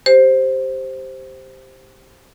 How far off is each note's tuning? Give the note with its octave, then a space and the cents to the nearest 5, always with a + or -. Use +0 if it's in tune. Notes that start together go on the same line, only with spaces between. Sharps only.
G4 +0 C5 +0